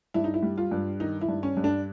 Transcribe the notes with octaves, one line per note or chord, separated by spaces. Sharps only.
G2 E4
D#4
E4
G3
F4
G2
D#3 D#4
E4
G2
C#4
G2
D4